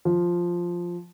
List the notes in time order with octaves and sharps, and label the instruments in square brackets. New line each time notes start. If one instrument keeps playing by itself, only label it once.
[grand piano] F3